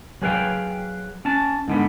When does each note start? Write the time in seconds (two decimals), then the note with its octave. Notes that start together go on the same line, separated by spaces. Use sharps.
0.22 F#3 G#4 B4 F5 G5
1.25 C#4 A5
1.68 G#2 D3 B3